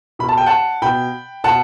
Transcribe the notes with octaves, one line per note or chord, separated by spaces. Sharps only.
B2 B5
A5
G5
F#5 A5
B2 G5 B5
B2 F#5 A5